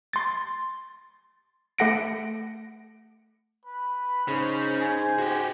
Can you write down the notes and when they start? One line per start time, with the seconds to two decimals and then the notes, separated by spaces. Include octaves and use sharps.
0.13 C6 A6
1.79 A3 A4 F#5 A#6 D7
3.65 B4
4.28 G#2 C#3 C5
4.81 G#5
5.19 F#4 G4